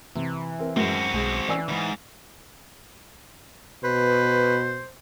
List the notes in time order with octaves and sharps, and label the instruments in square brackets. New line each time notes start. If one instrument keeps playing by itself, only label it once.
[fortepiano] C3 [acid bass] E3
[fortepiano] C4 A#4
[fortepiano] F#2 G#3 [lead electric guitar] C4 F#4
[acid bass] B1 [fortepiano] G#3 G#4
[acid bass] E3 [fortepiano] D5 G#5 E6
[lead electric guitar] D#2 G#2
[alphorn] B2 [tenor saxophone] B4 [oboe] C5